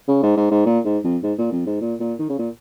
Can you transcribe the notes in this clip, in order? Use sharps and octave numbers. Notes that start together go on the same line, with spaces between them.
C#3
G#2
G#2
G#2
A#2
G#2
F2
G#2
A#2
F2
G#2
A#2
A#2
D#3
C#3
A#2